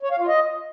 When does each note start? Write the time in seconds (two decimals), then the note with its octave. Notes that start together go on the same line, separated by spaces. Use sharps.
0.03 C#5
0.11 F5
0.19 F4
0.28 D#5